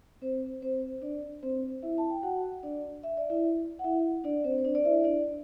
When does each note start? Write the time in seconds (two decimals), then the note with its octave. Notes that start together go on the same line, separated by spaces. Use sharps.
0.22 C4 C5
0.62 C4 C5
1.02 D4 D5
1.43 C4 C5
1.83 E4 E5
1.98 A5
2.10 G5
2.23 F#4 F#5
2.63 D4 D5
3.03 E5
3.17 D5
3.30 E4 E5
3.79 F#5
3.84 E4 E5
4.24 D4 D5
4.44 C4 C5
4.58 C5
4.64 D4 D5
4.75 D5
4.85 E4 E5
5.04 D4 D5